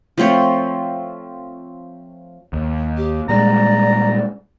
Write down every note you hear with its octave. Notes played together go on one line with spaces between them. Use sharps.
F3 A3 C4 C#5
D#2
G4
A#2 G3 G#3 D5 A#5